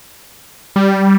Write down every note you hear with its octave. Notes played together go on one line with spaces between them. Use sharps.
G3